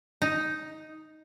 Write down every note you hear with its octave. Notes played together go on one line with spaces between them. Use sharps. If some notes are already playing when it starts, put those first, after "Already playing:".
D#4